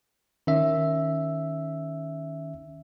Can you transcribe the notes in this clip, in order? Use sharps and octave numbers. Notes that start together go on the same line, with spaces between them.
D#3 C#4 E5